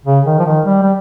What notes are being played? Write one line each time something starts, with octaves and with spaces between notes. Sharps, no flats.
C#3
D#3
F3
D#3
G3
G3